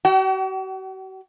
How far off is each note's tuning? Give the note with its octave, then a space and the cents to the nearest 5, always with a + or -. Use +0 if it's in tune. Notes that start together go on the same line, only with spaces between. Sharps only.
F#4 +45 G5 -40